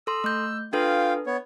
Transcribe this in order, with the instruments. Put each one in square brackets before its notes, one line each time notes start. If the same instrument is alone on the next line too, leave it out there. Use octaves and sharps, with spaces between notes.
[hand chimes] A4 C6 [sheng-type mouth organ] E6
[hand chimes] A3 G6
[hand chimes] D4 A4 B4 [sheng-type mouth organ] F4 F5 G5
[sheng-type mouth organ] B3 C#5